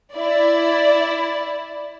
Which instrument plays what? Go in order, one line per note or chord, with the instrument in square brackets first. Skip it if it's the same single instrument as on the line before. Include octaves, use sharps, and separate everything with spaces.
[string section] E4 D5